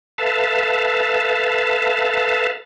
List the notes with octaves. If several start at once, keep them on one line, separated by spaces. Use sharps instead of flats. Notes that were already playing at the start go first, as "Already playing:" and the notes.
A4 B4 E5 F5 A5